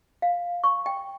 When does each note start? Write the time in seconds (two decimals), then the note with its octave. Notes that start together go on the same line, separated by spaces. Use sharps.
0.22 F5
0.64 C#6
0.86 G5